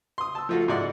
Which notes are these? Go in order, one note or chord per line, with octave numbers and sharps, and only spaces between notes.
C6 D#6
A5 E6
F3 A3 F4 F#4 A4
G#2 E4 D5 D#5 F#5